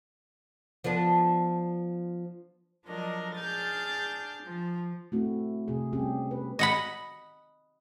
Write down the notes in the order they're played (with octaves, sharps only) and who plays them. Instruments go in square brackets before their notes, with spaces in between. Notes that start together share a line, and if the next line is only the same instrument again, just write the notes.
[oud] F3 B3 D4
[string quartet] F3 F#3 D4 A#4 D#5
D4 G#4 F6 G6 A6
F3
[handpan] A3 C4 E4 F#4
C3 G#4
G3 C4 C#4 G4 G#4
B4
[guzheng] D#5 F#5 B5